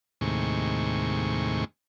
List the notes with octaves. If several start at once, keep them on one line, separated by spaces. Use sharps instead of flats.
D#2 A2 C3 G#3 C#6